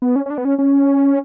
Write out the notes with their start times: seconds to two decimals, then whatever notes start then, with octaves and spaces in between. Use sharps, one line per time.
0.02 B3
0.16 C#4
0.26 C#4
0.30 D4
0.38 B3
0.45 C#4
0.59 C#4